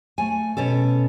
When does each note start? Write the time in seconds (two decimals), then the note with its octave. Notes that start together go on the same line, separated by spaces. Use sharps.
0.18 A3 G#5
0.57 B2 C#4 A4